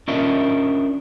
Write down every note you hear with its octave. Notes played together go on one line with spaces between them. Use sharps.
C#4 D4 F4 A#4 D#5 E5